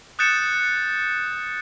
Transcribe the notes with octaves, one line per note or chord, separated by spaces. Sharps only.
D#6 F#6 G6 A6 C#7 E7